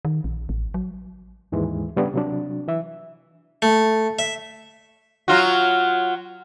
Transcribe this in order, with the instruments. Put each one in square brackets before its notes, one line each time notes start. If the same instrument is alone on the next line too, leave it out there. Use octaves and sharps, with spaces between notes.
[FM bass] D#3
A#1
A1
F#3
[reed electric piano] D#2 G#2 E3 G#3
C#3 G3 B3 D4
C3 F#3 D4
E3 E5
[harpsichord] A3
E5
[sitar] F#3 F4 F#4